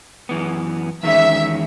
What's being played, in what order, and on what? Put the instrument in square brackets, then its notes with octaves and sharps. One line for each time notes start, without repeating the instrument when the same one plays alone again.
[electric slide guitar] F#2 E3 B3
[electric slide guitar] E2 D#3 G#3 C#4 [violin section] E5